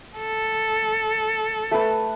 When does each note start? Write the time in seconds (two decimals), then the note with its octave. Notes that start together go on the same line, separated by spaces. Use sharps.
0.17 A4
1.71 A3 B4